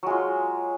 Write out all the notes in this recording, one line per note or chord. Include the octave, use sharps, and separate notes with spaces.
F#3 G#3 F4